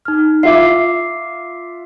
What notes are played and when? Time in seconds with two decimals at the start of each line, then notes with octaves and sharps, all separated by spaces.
0.05 D#4 F6
0.43 F4 E5 D6 C7